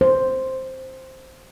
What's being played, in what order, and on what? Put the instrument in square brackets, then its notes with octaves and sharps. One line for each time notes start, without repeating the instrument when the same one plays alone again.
[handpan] C5